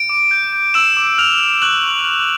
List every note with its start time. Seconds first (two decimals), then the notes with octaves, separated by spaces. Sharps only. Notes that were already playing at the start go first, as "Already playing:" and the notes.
Already playing: D7
0.09 D6
0.31 G6
0.53 G6
0.74 D6 E6 E7
0.97 D6
1.18 F6 F7
1.40 F6
1.61 C#6 F#6 F#7
1.83 C#6
2.05 F6